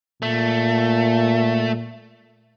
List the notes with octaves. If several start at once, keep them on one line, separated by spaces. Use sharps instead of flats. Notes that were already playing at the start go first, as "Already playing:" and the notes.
A#2 A3